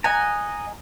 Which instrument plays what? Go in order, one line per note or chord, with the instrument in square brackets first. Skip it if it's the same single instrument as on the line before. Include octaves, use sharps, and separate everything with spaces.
[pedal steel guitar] D#5 F#5 A#5 [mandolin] G#5